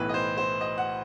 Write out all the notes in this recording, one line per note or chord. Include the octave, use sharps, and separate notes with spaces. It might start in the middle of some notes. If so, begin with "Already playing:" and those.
Already playing: B1 A2 E3 B4
D#5
C5
C5
D#5
F#5